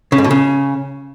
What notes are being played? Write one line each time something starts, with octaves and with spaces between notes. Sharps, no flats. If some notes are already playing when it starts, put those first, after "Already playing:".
C#3
G#2
B2
C#3